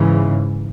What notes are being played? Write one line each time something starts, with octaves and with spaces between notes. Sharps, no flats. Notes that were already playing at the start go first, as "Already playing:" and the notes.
Already playing: G#2 C#3 E3